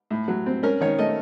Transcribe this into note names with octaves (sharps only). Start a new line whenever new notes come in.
A2
F#3
C4
C#4 A#4
D#3 C#5
A3 D#5